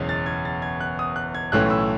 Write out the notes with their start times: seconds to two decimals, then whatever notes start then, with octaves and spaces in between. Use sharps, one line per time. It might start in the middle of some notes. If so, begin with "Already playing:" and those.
Already playing: F#1 E2 B2 G#3 C#4
0.09 A6
0.26 G#6
0.45 A6
0.62 G#6
0.80 F#6
0.99 D#6
1.16 F#6
1.35 G#6
1.52 B1 A2 E3 A3 C#4 F#6
1.70 E6